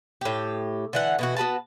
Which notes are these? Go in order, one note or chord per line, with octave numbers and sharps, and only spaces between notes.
A2 G4
D3 E3 F#5
B2 E3 F#4
B3 F#4 B4 A5